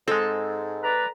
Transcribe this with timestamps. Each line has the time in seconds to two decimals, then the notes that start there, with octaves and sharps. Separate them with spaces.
0.08 G#2 G#3 C4 A4
0.83 B4 D5 A#5